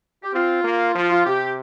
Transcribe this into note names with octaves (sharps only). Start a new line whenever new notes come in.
G4
C4 F4
A#3
F3 F4
F4
C3 G4